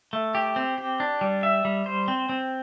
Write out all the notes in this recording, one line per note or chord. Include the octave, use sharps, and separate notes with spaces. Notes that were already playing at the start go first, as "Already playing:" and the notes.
A3
G4
C4
G4
D4
G3
E5
G3
C5
C4
C4